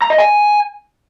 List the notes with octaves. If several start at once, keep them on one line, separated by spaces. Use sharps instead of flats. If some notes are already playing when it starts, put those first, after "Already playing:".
A#5
D#5
G#5